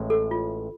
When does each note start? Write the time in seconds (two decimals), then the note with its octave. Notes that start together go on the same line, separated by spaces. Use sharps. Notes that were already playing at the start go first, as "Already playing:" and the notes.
Already playing: A1 A2 G#3
0.10 A4
0.31 F4